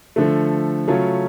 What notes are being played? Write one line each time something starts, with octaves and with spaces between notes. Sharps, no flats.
D3 F3 A3
C#3 F#3 A3 C#4 F4